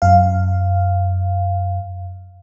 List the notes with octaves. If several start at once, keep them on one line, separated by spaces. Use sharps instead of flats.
F#2 F5